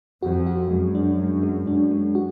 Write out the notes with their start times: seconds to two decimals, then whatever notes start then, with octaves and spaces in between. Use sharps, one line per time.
0.22 F2 F#4
0.47 F#4
0.70 F#2 G#3
0.95 D4
1.19 G#3
1.43 G#3
1.67 F#2 D4
1.91 G#3
2.15 F#4